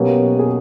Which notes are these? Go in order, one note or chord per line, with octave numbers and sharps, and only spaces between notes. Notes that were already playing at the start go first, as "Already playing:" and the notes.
Already playing: B2 F#3 A#3 C#4 G4
G#4